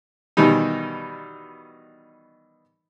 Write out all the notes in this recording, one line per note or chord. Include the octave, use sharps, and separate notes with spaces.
B2 D#3 E3 G3 D#4